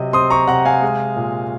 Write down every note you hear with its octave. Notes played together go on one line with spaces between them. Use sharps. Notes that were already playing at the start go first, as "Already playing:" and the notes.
Already playing: C3 F#3 D#5
C4 C6 D#6
A#5 C#6
C3 F#5 A#5
F5 G#5
G#3
A#2